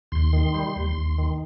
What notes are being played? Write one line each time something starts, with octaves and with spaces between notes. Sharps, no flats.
D#2 C6
D#3
G3
D#2
D#2
D#3